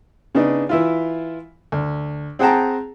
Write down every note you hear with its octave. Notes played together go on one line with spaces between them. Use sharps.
C#3 B3 D4 D#4
E3 E4 F4
D2
C4 G#4 F#5 G5 A5 A#5